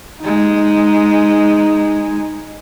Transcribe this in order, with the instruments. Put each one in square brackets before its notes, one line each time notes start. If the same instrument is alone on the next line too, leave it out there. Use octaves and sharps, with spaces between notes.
[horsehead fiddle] G#3 D#4